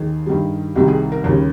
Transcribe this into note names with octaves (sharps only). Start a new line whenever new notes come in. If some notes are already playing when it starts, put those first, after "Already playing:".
Already playing: D#2 D#3 G#4
G2 D#3 G3
C2 C3 D#3 G3 G4
G#4
A#4
D#2 C#3 G3 A#4